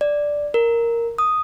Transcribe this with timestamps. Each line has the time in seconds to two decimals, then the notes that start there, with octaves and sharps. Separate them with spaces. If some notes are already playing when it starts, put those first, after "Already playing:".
0.01 D5
0.54 A#4
1.18 D#6